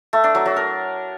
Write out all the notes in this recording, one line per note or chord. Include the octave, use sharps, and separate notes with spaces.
A3
D4
F#3
F#3
A#4